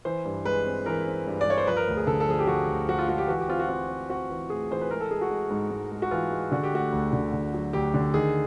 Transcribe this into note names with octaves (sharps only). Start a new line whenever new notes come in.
E3 C5
G2
G#3 B4
C4
E3 A#4
C4
G2
D5
G2 C#5
C5
F3 B4
A#4
D2
G#4
D3 A4
A4
F3 G#4
G4
F3 F#4
D2
F3 F#4
F4
G#3 F#4
G4
E3 F#4
G4
C4 F4
F#4
C4 F4
C4
C4 F#4
E3
A2 G#4
E3 C5
B4
G#3 A#4
A4
G#3 G#4
F#4
G#3
G#2
G#2
G#3
F#4
E3 F4
G#3
D3 F#4
G4
A3 F#4
D2
D3
D3
F#3
D2 G4
D3
D#3 G#4